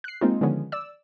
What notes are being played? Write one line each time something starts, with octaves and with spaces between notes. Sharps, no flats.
F#6 C7
G#3 A#3 C4 D#4 F4
D3 D#3 F3 G#3 B3 C#4
D5 E6